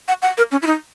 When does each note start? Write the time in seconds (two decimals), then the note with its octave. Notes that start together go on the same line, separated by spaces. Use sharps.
0.08 F#5
0.22 F#5
0.37 A#4
0.52 C#4
0.62 E4
0.67 D#4